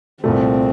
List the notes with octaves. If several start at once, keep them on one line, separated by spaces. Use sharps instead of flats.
C2 A#2 A3 C4